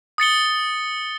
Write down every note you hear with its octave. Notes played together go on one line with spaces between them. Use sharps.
D#6 A6 C#7 G7